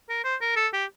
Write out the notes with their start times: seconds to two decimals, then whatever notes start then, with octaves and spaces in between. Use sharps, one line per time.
0.10 A#4
0.24 C5
0.41 A#4
0.56 A4
0.73 G4